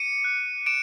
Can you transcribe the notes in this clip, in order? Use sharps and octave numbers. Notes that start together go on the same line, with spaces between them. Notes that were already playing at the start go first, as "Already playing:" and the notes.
Already playing: D6 C#7 D#7
F#6
D6 D7 E7